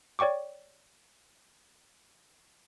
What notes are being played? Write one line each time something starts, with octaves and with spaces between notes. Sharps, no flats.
C#5 D5 G5 C#6 D6